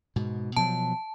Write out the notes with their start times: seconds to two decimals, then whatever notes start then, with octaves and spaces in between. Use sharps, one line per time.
0.16 G#2 B2
0.56 B2 F3 F#3 A5